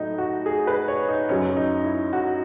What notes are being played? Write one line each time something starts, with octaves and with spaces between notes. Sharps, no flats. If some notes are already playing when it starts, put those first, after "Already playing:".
Already playing: A2 F#3 D#4
F#4
G#4
B4
C#5
D#4
F#2 C#3 F#3 C#4
D#4
E4
F#4